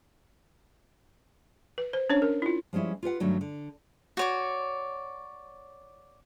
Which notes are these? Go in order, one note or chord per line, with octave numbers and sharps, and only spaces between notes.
B4
C5
C#4 D4 C#5
A#4
E4 F4
F3 G3 G#3 C#4 E4
F4 G4 B4 F#5
G2 D3 D#3 F#3 A3
D3
F#4 C#5 D5